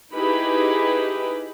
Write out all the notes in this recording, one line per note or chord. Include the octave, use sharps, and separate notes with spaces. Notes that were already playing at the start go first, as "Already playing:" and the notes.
D#4 E4 G4 G#4 B4 B5